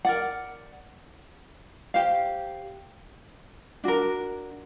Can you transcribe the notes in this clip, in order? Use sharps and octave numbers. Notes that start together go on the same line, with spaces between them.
A#4 D5 F#5
G4 C5 F5
D4 F#4 A#4